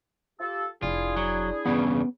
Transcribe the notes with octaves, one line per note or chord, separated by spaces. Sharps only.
F4 G4 A4
F1 D4 E4 F4 G#4
F#3
E2 G2 C#3 B3